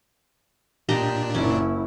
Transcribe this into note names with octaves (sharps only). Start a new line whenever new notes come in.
A#2 D4 G4 D#5 A#5
F#1 C#4 E4